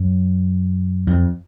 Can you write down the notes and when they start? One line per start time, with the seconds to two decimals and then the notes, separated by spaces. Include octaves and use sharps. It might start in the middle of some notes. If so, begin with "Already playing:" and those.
Already playing: F#2
1.07 F2